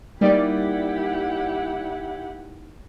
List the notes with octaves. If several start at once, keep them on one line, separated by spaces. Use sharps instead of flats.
G3 A#3 D#4 E4 G4 D5 F#5